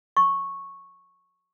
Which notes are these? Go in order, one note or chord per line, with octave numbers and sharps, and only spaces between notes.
C#6